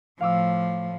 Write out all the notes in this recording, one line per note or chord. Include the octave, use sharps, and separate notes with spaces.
A2 F3 F5 D6 E6